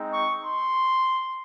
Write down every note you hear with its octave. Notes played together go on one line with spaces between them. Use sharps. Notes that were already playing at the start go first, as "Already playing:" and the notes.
Already playing: G#3 C4 D#4
C#6
C6